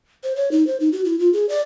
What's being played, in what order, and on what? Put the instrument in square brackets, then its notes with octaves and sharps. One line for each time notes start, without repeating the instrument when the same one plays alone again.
[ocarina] C5
C#5
D#4
C5
D#4
F#4
E4
F4
G#4
D5